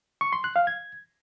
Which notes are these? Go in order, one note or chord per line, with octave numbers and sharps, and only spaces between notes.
C#6
C6
F#6
F5
G#6